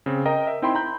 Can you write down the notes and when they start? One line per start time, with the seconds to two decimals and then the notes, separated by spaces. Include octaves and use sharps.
0.06 C#3 C4
0.25 A#4 D#5 G5 A#5
0.47 E5
0.62 C4 D#4 E4 G5 B5 C6
0.75 A#5 B5 G6